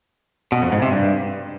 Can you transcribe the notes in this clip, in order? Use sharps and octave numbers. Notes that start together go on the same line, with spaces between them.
B2
F2
G#2
C3
G2